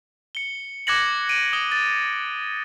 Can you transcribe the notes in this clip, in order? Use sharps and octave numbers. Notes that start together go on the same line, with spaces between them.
C#7 G7
D6 F#6 G#6 A#6 C#7 F#7
D7 D#7
D#6 G7
A6